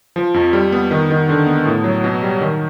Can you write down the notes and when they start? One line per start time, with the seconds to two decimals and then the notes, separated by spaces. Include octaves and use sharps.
0.16 F3
0.34 F2
0.53 G3
0.72 B3
0.91 D#3
1.10 D#3
1.29 D3
1.47 B3
1.65 A2
1.84 F#3
2.04 B2
2.22 G3
2.41 D#3